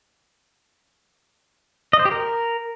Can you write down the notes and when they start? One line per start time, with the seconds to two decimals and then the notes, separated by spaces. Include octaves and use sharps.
1.93 D#5
1.99 C5
2.05 G4
2.11 A#4